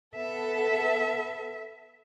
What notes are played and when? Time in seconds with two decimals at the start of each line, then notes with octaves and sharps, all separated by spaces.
0.15 B3 A4 E5